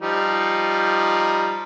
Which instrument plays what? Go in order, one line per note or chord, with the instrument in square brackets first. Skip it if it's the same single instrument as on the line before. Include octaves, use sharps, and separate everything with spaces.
[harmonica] F3 G3 D#4